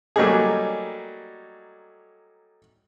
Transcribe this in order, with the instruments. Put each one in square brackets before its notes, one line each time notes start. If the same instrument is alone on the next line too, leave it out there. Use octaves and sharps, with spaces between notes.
[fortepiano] F#3 G3 A3 A#3 D#4 G#4